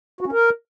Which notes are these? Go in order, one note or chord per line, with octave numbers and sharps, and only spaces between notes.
F#4
C#4
A#4